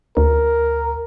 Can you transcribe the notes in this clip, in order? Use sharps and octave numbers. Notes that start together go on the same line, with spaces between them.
D2 A#4